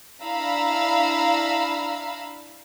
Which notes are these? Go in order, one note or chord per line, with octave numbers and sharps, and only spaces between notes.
D4 E4 F5 A#5 B5 E6